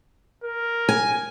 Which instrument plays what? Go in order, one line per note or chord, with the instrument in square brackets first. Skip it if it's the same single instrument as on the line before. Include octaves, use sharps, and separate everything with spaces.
[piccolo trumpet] A#4
[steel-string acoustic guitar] G#5